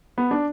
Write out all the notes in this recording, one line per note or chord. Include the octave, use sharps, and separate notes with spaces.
B3
D4